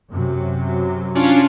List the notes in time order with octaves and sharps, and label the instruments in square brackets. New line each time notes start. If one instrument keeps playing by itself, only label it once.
[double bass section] F#2 C3 F#3
[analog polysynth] C#4 D4 F4